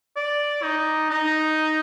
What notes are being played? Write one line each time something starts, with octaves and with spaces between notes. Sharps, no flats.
D5
D#4
D#4